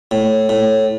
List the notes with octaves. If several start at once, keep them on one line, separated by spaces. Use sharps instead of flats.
A2
A2